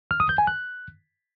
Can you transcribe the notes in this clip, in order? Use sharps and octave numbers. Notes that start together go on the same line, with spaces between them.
F6
D#6
G6
G#5
F#6